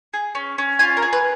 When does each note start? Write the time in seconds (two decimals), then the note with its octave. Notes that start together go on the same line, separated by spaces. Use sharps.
0.14 G#4
0.35 C#4
0.58 C#4
0.79 F4 G#5
0.97 A#4
1.02 G#4
1.13 B4